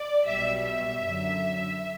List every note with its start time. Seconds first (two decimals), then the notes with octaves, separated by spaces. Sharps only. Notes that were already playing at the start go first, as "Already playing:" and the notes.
Already playing: D5
0.27 B1 B2 G3 E5
0.64 E5
1.01 F#2 D3 F#3